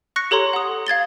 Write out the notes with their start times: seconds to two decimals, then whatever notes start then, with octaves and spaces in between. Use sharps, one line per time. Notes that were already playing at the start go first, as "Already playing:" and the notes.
0.16 C#6 F#6 A#6 C#7
0.31 G4 A4 C#5 A#5 C6
0.53 F#5 D#6
0.87 F5 G#6 A6 G7